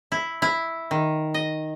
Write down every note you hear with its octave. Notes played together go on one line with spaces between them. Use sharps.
E4
E4
D#3
D#5